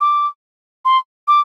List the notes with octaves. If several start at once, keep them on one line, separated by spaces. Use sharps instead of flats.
D6
C6
D6